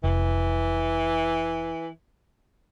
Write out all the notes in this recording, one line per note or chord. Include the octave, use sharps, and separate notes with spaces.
F1 E3